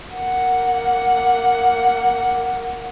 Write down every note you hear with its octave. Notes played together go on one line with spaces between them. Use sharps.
A#3 F#5